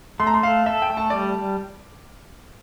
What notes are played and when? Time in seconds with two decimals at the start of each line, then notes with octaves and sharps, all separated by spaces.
0.20 A3 C6
0.27 A#5
0.34 C6
0.43 A4 F5
0.66 A4 E5
0.82 G5
0.90 A3
0.97 A5
1.10 G3 D5